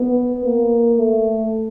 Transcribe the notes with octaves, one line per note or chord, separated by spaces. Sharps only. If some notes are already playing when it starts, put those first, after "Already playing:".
Already playing: B3
A#3
A3